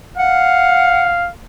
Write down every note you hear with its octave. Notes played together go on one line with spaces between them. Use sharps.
F5 F#5